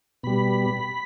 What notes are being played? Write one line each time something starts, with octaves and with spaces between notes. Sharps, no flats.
B2 G3 B5